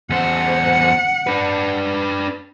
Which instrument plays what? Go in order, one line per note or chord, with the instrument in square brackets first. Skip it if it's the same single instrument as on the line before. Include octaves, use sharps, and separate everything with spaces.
[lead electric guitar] E2 C5 [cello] F#5
[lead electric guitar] D4 B4